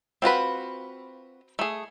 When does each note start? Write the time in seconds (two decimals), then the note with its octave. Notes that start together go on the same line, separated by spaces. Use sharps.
0.22 C4 F4 F#4 B4
1.59 A3 G#4